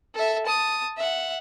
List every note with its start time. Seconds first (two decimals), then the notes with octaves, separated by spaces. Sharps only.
0.15 A4 E5
0.46 A5 D#6
0.97 E5 F#5